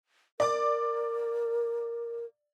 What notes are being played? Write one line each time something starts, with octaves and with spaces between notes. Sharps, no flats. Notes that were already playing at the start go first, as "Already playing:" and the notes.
A#4 D5 D6